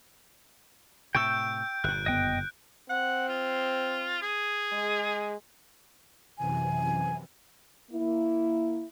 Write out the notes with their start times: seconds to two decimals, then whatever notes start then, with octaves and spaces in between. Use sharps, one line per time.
1.15 A2 C3 G5 C#6 E6 G6 D7
1.84 G1 A#2 F#6
2.06 F#1 B3 D#5 G5
2.90 C4 F#5
3.29 F4
4.22 G#4
4.73 G#3
6.38 F#2 C3 E3 G#5
7.91 A#3 E4